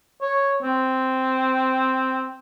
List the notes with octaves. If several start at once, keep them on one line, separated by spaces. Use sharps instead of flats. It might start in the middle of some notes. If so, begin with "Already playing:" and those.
C#5
C4